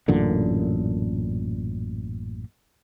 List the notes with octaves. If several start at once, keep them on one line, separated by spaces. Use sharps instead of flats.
A1 F#2 A#2 D3